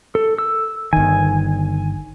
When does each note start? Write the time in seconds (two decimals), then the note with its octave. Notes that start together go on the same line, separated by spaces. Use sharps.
0.15 A4
0.38 E6
0.93 G1 D#3 G#5